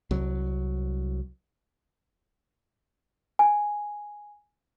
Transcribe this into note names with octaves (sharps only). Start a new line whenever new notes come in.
C2 F#3
G#5